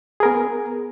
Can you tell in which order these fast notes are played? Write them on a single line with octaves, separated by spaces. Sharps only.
G#4 A#4 B3